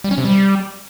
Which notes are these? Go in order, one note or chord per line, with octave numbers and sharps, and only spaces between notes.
G3
C#4
C3
G3